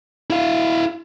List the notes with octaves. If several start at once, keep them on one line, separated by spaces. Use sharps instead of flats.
E4 F5